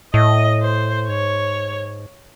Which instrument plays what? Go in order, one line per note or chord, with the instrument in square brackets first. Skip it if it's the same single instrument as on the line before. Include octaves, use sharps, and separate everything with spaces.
[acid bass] A2 [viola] D#5
[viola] C5
[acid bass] G#2 [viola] C#5